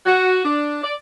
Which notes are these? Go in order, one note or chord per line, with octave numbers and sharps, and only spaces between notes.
F#4
D4
D5